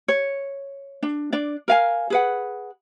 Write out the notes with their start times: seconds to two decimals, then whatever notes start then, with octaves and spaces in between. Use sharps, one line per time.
0.08 C#5
1.03 D4
1.33 D4 D5
1.68 A#4 F5 G#5
2.10 G#4 B4 F#5